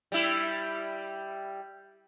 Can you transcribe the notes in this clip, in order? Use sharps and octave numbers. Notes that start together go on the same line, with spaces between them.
G3 E4